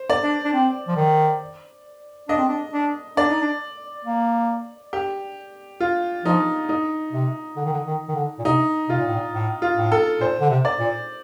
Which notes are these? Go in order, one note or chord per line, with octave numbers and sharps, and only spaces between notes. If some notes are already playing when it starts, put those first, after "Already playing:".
Already playing: C5
D5
D4
D4
C4
F3
D#3
D4 D#5
C4
D4
D4
D4 D5
D#4
D4
A#3
G4
F4
F3 D#4
D#4
C3
D3
D#3
D3
D#3
D#3
D3
A#2
C3 D#4
C3 F4
A#2
A2
A#2
A2
F4
A2
A4
A#2 C5
D3
C3
D5
A#2